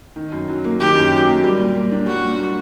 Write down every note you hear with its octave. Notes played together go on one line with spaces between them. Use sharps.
D#3
F#2
F#3
A#3
D#3 G4
F#2
F#3
A#3
G3
A#2
A#3
D4
G3 F#4
A#2
A#3